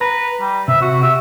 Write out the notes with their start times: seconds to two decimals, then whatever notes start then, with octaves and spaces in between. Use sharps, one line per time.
0.01 B4 A#5
0.40 G3
0.68 C3 E5
0.81 F#4
1.02 G4 E5